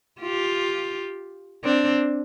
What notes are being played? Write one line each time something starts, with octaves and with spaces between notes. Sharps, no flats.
F4 G4
C4 D4